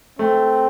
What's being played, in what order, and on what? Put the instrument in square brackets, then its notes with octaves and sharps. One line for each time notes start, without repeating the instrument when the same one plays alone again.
[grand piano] A3 [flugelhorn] C4